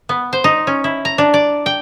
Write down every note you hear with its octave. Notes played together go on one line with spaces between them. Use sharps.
B3
C5
D#4
C#4
E4
A#5
D4
D5
G5